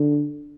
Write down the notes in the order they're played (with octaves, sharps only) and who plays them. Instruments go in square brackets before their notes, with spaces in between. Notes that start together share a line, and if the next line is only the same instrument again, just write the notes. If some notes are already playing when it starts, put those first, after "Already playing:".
Already playing: [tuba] D3